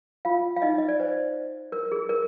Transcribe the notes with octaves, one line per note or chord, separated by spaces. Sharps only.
F4 F5
F5
D#4 D#5
D#5
D5
C5
A#4
G#4
A#4